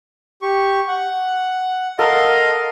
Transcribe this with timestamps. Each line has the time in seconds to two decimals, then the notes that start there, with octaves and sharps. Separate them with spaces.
0.42 G4 C#6
0.88 F#5
1.99 A4 A#4 D#5 F5 F#5 C6